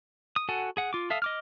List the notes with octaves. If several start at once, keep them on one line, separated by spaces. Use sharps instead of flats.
D#6
F#4 A4 F#5 G#5
G#4 F#5
F4 D6
A4 E5 F5 D#6
D#5 D6 F6